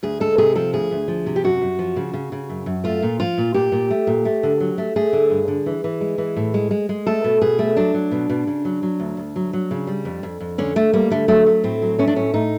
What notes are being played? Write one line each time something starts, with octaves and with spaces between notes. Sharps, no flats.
D2 G#4
G#3 A4
C3 G#4
F3 A4
D2 G#4
D2
F3
C3
G4
F#2 F#4
F#2
F3
C#3
C#3
C#3
F#2
F#2
A3 F4
A#2
F3 F4
A#2
A#2 G4
A#2
A3
A#2
A3
D3
F#3
A3
A3 G#4
D3
G2
D3
E3
E3
G#3
E3
A2
G#3
G#3
G#3
A3 A4
B2
B2 G#4
A3
F#3 D4
F#3
B2
B2
C#3
F#3
F#3
D2
D2
F#3
F#3
C#3
G3
F2
F2
F2
D3 C#4
D3 A3
G3 A#3
D3 A3
F#3 A3
A3
A2 C4
F#3
A3 C#4
D4
A2 C#4
A2 D#4